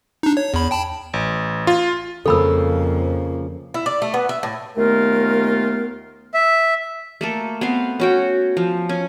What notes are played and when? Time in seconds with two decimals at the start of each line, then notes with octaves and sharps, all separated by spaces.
0.23 D4 D#4
0.37 C#5
0.54 E2 B5
0.71 G5 A5 B5
1.13 A1
1.67 F4
2.26 F2 C#3 F3 A#3 A4 B5 E6
3.74 E4
3.86 D5
4.02 A3
4.14 B3
4.29 E5
4.43 A2
4.77 D#2 A3 B3 F4 A#4
6.34 E5
7.21 A3 A#3 A4
7.61 B3 C4 F5
8.00 C#4 F#4 G5
8.57 F3
8.89 C#4